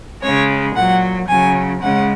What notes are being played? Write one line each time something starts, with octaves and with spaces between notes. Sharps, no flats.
C#3 G#3 C#5
A#2 F#3 F#5
C#3 F#3 G#5
C#3 G#3 F#5